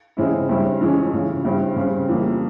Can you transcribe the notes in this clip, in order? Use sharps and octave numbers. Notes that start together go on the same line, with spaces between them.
C#3 E3 G#3 C4 E4
G2 G3 C4 E4
F2 E3 G#3 C#4
F2 C#3 E3
G2 G3 C4 E4
C#3 G3 C4
F2 E3 G3 A#3